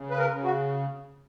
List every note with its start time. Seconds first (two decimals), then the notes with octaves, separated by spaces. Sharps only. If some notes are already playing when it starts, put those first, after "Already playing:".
Already playing: C#3
0.10 B4
0.18 A#4
0.31 C#3
0.44 F#4